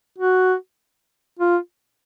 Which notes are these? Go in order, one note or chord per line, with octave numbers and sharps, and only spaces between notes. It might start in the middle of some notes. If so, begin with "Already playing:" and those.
F#4
F4